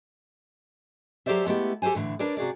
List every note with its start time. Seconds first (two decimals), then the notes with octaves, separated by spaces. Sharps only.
1.26 F#3 G4 A4 C5 D5 E5
1.45 G#3 A3 B3 E4 G4
1.82 G4 A4 A#4 C5 G#5
1.95 A2 D3 E3
2.19 D4 A#4 B4 C#5 D5
2.37 C3 F#4 G#4 D5